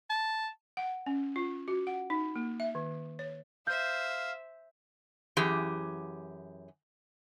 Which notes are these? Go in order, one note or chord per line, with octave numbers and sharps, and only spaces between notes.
A5
F#5
C#4
F4
F#4
F#5
D#4
A#3
E5
D#3
C#5
C5 E5 F5 G6
F#2 E3 G4 G#4